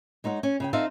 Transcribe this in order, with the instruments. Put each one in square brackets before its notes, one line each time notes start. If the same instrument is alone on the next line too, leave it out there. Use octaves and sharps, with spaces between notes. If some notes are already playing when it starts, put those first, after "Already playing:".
[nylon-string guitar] G#3 D#4 C#5 E5 F#5
C#4
C#3 G#4 G5
C4 D#4 F4 A4 E5 F5